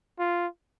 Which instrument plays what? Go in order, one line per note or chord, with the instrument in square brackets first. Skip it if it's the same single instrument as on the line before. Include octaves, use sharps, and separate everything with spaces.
[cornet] F4